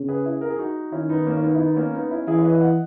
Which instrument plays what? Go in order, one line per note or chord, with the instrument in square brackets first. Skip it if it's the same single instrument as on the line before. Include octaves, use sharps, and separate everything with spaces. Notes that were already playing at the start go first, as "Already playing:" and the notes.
Already playing: [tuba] C#3
[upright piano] G#4 B4
E4 G#4
A#4
G#4
D#4 F#4
[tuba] D#3 [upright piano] C#4 E4
[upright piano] B3 D#4
A#3 C#4
C#4
B3 D#4
E4
B3 D#4
B3
A#3 C#4
B3 D#4
C#4 E4
[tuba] E3 [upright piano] E4 G#4
[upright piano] C#5
B4 D#5
E5
D#5 F#5